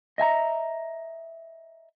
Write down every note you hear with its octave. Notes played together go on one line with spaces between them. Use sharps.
D#5 E5 G#5 A#5